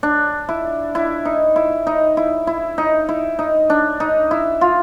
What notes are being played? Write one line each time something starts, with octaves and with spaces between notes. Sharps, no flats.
D4
E4
E4
D#4
E4
D#4
E4
E4
D#4
E4
D#4
D4
D#4
E4
F4